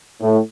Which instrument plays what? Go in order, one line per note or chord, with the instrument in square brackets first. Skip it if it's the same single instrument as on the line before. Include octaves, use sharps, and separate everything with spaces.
[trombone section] A2